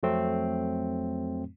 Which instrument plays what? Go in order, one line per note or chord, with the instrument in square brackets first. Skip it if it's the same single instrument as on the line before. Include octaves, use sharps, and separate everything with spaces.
[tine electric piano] F2 F#3 A3 C4